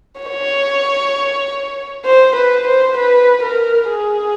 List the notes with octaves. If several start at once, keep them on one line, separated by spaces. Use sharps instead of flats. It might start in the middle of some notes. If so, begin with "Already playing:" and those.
C#5
C5
B4
C5
B4
A#4
G#4